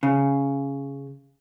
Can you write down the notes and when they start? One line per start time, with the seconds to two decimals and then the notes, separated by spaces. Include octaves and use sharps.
0.03 C#3